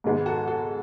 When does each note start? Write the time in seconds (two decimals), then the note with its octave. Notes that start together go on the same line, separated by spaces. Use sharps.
0.04 G#2 D#3 G#3 B3
0.26 F#4 A4
0.47 F#4 A4